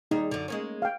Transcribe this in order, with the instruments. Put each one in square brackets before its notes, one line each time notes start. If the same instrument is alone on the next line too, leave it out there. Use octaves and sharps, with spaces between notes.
[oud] D#2 G3 G#4 [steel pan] D#4
[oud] F#2 D3
G#3 A#3 C#4
[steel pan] F5 G5